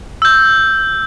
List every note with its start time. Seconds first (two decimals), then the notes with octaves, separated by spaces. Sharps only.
0.22 E6 G6